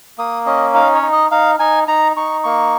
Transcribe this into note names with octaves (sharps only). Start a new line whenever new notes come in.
A#3 D#6
C#4 D#5
D#4 F5
C#5
D#4
D#5
D#4 F5
D#4 G#5
D#4 A#5
D#4 C#6
A#3 C#6